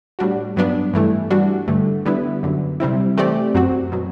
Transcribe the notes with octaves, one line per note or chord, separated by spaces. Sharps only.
A2 G3 D4 F#4
G2 F#3 B3 D4
G2 E3 A3 E4
E3 G3 D4 F#4
G2 D3 A3
D3 G3 B3 E4 B4
F#2 D3 F#3
C3 G3 C4 E4
E3 A3 C4 G4 D5
F#2 F#3 C4 F#4
B2 F#3